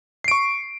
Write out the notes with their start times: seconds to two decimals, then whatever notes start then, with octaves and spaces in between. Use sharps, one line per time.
0.24 C7
0.28 D7
0.31 C#6